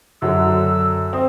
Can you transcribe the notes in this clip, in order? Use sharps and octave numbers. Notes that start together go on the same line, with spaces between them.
F#2 D3 F#3 E6
C4 D#6